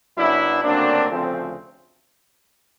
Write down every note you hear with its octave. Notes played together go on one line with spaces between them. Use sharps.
F#2 C#3 F#3 B3 D4 E4
D2 C#3 F#3 A#3 C4 D4
D2 C#3 F3 A3 C4